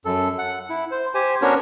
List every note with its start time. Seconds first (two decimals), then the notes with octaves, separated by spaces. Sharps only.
0.05 F#2 A4
0.38 F#5
0.70 E4
0.91 C5
1.15 G4 C5 G#5
1.42 B3 C#4 D4 F#4 A#4 C#5